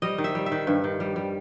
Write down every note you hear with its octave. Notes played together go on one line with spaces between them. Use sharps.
G3 D#5
D#3
E5
G3
E5
D#3
G2
D#3
G3
G3